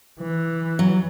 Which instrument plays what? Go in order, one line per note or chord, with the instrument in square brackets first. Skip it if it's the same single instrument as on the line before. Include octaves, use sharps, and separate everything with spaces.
[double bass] E3
[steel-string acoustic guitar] F#3